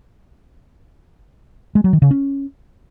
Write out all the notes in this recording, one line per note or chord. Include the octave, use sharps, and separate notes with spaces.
G#3
F#3
D#3
C#3
C#4